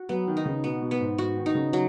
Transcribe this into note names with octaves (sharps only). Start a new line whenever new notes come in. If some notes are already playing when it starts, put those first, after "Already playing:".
Already playing: F#4
F#3 B3
D#3
D#4
C#3
B2 B3
B2
B3
G#2
G#2 F#4
D#3
D#4
C#3
F#3